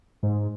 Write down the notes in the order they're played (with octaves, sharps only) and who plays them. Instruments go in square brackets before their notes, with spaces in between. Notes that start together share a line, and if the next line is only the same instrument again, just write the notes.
[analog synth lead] G#2